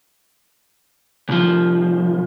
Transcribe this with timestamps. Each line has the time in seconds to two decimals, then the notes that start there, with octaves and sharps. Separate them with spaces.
1.29 C2 F3